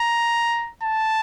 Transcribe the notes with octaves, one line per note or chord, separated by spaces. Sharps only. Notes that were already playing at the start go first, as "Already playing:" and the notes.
Already playing: A#5
A5